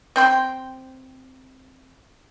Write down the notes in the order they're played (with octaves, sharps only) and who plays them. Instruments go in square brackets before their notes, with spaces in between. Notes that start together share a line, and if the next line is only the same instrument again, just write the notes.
[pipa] C4 G5 C6